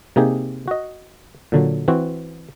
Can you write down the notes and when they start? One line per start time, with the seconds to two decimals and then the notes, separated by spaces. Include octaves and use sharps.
0.16 C3 A#3 D#4 G4 G#4
0.68 F#4 D#5
1.52 A#2 D3 F#3
1.88 E3 C4 F#4